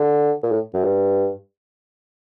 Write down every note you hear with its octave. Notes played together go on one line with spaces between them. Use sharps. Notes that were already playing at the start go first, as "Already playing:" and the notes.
Already playing: D3
A#2
A2
F#2
G2